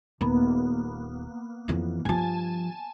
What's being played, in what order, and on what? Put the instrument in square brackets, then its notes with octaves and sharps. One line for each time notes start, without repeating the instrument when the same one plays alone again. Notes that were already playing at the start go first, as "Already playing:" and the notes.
[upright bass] D#1 [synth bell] A#3 B3
[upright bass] F2 E3
[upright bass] G2 F3 [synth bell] G#5 A5